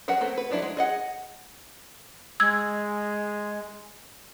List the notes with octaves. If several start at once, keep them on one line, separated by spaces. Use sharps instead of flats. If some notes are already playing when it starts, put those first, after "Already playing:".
F#3 A#4 B4 F#5
A3 A#3 C4
B4
F3 F#3 D4 E4
G#3
G#4 D#5 F#5
G#3 E6 G#6